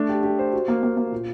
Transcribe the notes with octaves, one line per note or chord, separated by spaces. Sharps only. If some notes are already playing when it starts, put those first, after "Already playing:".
Already playing: A3 D4
G4
G4
C5
F#4
A#3
A#3
A#3
A#2